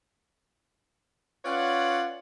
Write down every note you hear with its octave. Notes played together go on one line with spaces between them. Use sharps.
C#4 F4 B4 C#5 D5 F#5